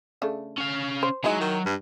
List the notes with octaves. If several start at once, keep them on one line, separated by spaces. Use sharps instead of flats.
C#3 A3 D4
C#4 F5
C5
F#3 G#3 D#4 E4
D#3
G2